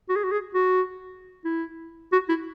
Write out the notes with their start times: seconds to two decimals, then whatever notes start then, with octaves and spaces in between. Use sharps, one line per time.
0.09 F#4
0.16 G#4
0.24 F#4
0.31 G#4
0.54 F#4
1.45 E4
2.12 F#4
2.29 E4